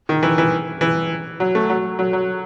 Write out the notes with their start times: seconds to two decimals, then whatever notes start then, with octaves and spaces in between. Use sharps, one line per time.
0.09 D#3
0.23 E3
0.38 E3
0.81 E3
1.40 F#3
1.55 A3
1.70 F#3
1.99 F#3
2.13 F#3